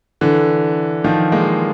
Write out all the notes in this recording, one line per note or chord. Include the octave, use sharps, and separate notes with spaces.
D3 E3
D#3 F3
G#3 A#3